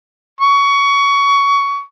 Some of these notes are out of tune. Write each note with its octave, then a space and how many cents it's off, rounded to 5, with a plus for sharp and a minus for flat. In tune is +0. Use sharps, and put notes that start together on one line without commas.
C#6 +20